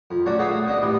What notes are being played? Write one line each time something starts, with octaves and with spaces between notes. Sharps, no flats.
F2
F#3 A3 C#4 F#4 A4 D5
F#4 G#4 A4 B4 E5 F5
A3 D#6
B3 C4 D4 D#5
A2 G3 B3